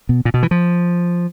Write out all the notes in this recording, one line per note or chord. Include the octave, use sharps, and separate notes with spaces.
B2
A#2
B2
E3
F3